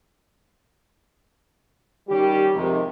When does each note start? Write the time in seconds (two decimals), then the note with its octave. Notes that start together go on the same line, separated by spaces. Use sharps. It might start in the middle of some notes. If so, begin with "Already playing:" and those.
2.08 D#3 G3 C#4 G4
2.55 F2 G#2 C3 D#3